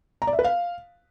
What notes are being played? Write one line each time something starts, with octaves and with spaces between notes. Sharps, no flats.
A#5
D5
E5
B4
F5